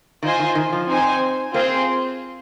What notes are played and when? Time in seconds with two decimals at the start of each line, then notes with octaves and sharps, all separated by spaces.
0.23 D#3 F4 C5 D#5 G#5
0.39 D#3
0.55 D#3
0.73 F3
0.88 C4 D#4 C5 G#5
1.54 A#3 C4 F4 G#4 C5